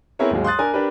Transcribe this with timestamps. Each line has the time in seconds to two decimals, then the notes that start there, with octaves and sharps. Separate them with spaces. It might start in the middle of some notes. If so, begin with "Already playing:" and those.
0.19 B3 C4 E4 G#4 A#4 C#5
0.31 D#2 G#2 F#3 G#3
0.44 C6 D#6 F#6 A6
0.58 D4 A#4 G#5
0.74 D4 G4 A#4 B4